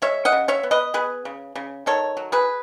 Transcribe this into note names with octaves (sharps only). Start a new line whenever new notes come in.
G#3 C#5 E5
D#5 F#5
C#3
C#5 E5
B3
B4 D#5
B3 G#4 B4
C#3
C#3
D#3 A4 C#5
F#3
G#4 B4